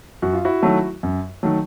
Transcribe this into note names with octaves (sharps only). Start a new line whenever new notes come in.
F#2 F#4
F4
E4 F#4
D#3 F#3 A3
F#2
D#3 F#3 A3